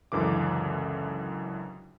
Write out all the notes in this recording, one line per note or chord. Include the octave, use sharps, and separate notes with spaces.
C#2 F#2 D3 E3 D6